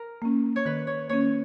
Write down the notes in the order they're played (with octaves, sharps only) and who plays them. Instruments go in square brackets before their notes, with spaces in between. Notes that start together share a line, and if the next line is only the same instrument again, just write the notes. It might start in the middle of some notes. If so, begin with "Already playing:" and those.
Already playing: [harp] A#4
[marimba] A#3 C#4
[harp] C#5
[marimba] D#3 [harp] B4
[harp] C#5
[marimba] A#3 C#4 [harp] C#5